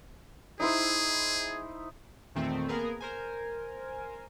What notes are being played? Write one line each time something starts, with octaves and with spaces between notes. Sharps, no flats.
D#4 E4 G#4 C5
E2 A#2 D#3 A3 C4
A#3 B3 G#4 A#4 B4
A#4 C5 G#5